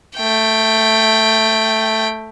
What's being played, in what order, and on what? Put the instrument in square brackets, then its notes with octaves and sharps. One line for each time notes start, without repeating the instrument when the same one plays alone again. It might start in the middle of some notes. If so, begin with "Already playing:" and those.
[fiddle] A3 G5